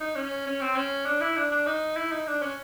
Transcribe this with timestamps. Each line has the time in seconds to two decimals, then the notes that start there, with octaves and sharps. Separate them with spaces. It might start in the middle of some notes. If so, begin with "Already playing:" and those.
0.01 D#4
0.15 C#4
0.46 C#4
0.61 C4
0.76 C#4
1.06 D4
1.21 E4
1.37 D4
1.51 D4
1.67 D#4
1.97 E4
2.12 D#4
2.27 D4
2.42 C#4